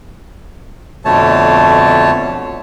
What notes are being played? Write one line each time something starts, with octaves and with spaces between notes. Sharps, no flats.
F2 B2 D3 A3 C#5 A5